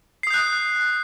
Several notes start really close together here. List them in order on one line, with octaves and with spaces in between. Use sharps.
C7 D#6 G6 F#6